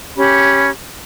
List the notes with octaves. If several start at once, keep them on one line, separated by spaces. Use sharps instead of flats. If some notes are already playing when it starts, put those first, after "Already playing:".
C#4 G4 B5